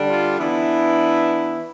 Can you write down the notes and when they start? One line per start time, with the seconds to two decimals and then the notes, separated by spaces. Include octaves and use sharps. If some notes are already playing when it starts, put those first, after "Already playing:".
Already playing: D3 G3 D4
0.09 F4
0.39 E3 B3 D4 E4